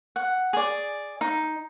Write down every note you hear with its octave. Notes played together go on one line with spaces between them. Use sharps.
F#5
G#4 D5
D#4